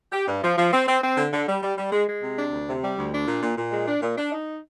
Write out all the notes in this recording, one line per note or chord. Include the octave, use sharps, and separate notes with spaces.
G4
G2
F3
F3
C4
C4
C4
D3
D3
G3
G3
G3
G#3
G#3
C3
D4
D2
C3
G3
D2
D4
A#2
A#2
A#2
G#3
D4
A#2
D4
D#4